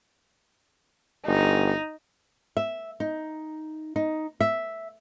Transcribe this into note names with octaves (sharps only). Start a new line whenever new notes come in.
G1 D#4
E5
D#4
D#4
E5